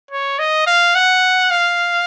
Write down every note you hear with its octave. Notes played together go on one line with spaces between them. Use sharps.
C#5
D#5
F5
F#5
F5